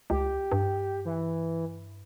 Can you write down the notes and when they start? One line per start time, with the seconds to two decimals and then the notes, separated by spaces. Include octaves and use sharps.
0.10 C#2 G4
0.52 G2
1.05 E3